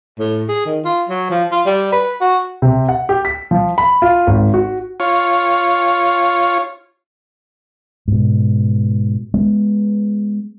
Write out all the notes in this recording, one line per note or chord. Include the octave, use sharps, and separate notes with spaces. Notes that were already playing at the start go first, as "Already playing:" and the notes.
A2
G#4
D#3
F4
F#3
F3
F4
G3
B4
F#4
C3
F#5
G4
B6
F3
B5
F4
G#1
F#4
F4 C#5
G#2 B2
G#3 B3